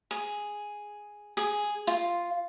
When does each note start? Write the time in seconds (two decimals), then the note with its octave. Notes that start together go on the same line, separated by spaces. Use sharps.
0.11 G#4
1.37 G#4
1.87 F4